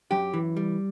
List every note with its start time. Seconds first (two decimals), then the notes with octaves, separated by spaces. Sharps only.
0.11 F#2 G4
0.34 E3
0.57 G3